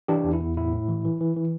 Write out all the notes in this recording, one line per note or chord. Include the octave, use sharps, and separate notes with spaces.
E3 D4 G4
E2
E4
E2
A2 E4
A2
E3
E3
E3
E3